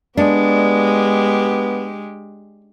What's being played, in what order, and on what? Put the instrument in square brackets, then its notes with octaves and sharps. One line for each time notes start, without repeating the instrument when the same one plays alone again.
[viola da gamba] G#3 G4 [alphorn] B3 [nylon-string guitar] D4